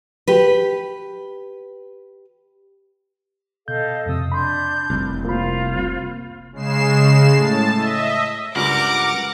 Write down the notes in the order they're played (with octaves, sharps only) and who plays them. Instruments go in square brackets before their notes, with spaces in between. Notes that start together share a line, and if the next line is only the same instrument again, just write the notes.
[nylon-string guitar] G4 B4
[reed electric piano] B2 G6 [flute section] A4 D#5 F5
[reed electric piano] F2 C3 [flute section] D#6 E6
[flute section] D4 G6 [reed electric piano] B5 C6
[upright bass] F1 C4 [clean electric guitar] C2
[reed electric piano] A#3 B5 [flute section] F4 C5 F5
[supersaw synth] C#3 G#3 C7 E7
A2 A5
D#5 E5
[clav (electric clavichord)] C#2 G2 [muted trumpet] A#4 [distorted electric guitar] F#5 [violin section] D6